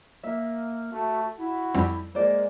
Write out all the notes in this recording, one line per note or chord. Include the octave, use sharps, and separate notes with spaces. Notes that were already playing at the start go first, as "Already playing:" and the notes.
A#3 E5
A3 F#4
E4 F#4
F2 G3 C4
G#3 A#3 C5 D5